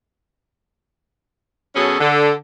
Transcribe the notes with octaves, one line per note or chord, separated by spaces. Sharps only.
B2 F#3 C#4 G#4 A4
D3